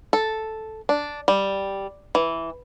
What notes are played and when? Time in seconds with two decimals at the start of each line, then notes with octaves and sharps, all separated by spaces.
0.13 A4
0.89 D4
1.28 G3
2.15 E3